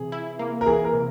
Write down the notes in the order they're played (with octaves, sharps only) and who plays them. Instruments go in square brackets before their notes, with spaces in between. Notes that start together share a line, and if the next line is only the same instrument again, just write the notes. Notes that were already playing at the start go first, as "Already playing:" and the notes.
Already playing: [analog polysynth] C3 E3 [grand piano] G#4
[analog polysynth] E4
A#3
[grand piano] A#4
[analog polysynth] E3 [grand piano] G#4
[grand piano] A#4
[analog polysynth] C3